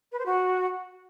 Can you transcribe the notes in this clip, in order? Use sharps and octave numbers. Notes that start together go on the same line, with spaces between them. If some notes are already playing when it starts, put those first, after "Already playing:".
B4
C5
F#4